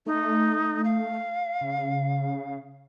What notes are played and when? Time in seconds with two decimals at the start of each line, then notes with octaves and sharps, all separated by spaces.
0.06 A3 D#4
0.84 F5
1.61 C#3